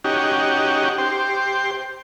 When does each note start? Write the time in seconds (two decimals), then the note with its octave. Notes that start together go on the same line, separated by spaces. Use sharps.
0.04 C#4 D#4 F#4 G4
0.98 G4 C5